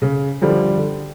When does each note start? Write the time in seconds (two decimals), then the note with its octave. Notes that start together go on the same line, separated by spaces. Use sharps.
0.02 C#3
0.41 D3 F3 G3
0.77 D3